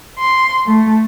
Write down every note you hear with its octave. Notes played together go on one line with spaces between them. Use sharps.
C6
A3